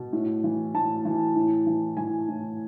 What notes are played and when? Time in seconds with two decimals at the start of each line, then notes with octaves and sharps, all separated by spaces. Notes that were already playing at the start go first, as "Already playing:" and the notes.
Already playing: B2
0.13 A2
0.44 E3
0.74 A2 A5
1.05 E3
1.35 A2
1.67 E3
1.97 E3 G#5
2.29 A2